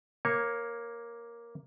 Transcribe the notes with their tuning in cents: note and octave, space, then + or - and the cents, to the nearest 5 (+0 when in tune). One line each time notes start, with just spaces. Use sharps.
A#3 +5 C#5 -10